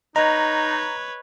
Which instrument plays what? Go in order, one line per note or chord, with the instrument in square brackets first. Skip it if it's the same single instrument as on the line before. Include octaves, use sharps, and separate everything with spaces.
[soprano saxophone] D#4 [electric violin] B4 C#5 [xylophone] D#5 [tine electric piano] A#5